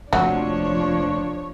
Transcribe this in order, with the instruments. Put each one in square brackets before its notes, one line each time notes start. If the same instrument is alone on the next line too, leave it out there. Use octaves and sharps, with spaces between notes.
[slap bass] F1 [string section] D#2 F3 C#5 [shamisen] F#3 [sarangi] D4